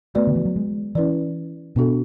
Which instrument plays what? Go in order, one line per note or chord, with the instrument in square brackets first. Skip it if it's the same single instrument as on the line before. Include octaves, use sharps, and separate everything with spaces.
[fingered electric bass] A3 [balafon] B3 F#4 B4 D5
[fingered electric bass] D3
E3
F#3
G#3
[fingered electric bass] E3 [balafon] C#4 E4 B4 D5
[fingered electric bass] B2 [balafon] B3 D4 F#4 A4